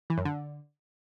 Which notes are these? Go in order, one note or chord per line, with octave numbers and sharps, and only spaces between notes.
E3
F#2
D3